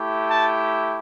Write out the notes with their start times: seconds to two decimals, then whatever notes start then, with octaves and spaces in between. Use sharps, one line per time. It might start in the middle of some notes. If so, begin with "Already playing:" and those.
Already playing: A3 E4 G4
0.30 A5